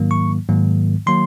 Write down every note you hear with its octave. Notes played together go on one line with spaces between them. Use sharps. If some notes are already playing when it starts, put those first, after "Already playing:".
Already playing: G#2 D#3 F#3 A#3
C#6
G#2 D#3 F#3 A#3
D#3 F#3 A#3 C6